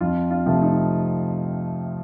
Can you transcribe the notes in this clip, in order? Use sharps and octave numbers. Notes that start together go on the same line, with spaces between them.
F2 F4
F4
C3 F3 A3
D#4